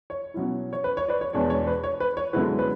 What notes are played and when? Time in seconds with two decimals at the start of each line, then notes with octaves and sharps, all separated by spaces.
0.10 C#5
0.34 B2 F#3 C#4 E4
0.73 C#5
0.84 B4
0.97 C#5
1.08 B4 D5
1.21 C#5
1.33 E2 B2 G#3 D4 C#5
1.50 C#5
1.67 B4
1.84 C#5
2.00 B4
2.17 C#5
2.33 F#2 D3 G#3 B3 E4 B4
2.59 B4